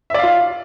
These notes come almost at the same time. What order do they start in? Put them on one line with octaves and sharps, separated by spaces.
E5 D5 F5 F4